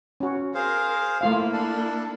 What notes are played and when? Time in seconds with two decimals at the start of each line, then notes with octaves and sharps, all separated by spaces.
0.20 C#4 F#4
0.55 G#4 A#4 C5 F5
1.21 A3 A#3 E4 F4 F5
1.52 D4 A4